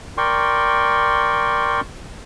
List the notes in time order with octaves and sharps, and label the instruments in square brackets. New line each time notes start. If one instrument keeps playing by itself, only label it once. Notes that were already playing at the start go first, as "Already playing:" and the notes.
[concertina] A#4 D5 G5 C6 C#6